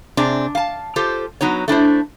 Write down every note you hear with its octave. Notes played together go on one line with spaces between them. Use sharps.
C3 C4 D4 G#4
F5 A5
F4 G4 A4 C5
F#3 B3 D#4 C#5
A3 D4 E4 C5